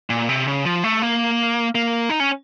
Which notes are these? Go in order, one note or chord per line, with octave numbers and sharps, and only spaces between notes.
A#2
C3
C#3
F3
A3
A#3
A#3
D#4
C#4